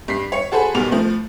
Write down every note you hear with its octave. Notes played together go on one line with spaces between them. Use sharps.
G2 B6 C7
C#5 C#7
F#4 G#4 A4 C5 G#5 B5
B1 B2 G3 A#4 F7
A2 F3